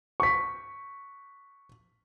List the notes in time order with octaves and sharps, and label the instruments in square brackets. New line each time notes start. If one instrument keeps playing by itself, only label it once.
[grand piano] C#6 B6